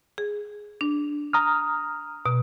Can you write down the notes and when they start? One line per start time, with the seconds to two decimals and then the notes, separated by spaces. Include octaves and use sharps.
0.18 G#4
0.81 D4
1.33 A#5 D#6 F6
2.26 B2